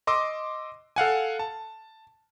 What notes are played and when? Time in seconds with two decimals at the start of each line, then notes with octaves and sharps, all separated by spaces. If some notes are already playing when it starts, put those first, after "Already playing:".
0.07 D#5 C6 D6 E6
0.96 A4 F5 F#5 G#5
1.39 A5